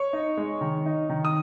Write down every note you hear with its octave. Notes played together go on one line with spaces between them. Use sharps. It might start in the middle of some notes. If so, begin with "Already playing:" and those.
Already playing: C#5 C#6
D#4
G#3
D#3
D#4
D#3
D#6